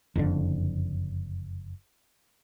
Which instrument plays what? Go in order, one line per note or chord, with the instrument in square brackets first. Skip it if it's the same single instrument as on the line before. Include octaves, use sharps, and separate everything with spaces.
[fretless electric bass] F#1 F2 B2 D3